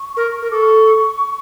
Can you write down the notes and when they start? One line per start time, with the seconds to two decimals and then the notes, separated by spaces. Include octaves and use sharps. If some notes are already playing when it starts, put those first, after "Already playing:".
Already playing: C#6
0.17 A#4
0.42 A#4
0.51 A4 D6
0.55 C#6